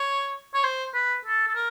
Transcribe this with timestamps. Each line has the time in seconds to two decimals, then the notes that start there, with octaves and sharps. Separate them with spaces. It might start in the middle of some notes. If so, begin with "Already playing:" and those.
Already playing: C#5
0.54 C#5
0.63 C5
0.94 B4
1.25 A4
1.47 A4
1.55 A#4